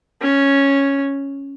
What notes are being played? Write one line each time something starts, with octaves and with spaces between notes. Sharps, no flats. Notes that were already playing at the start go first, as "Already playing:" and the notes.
C#4